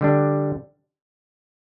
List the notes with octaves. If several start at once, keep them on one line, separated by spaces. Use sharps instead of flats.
D3 G3 D4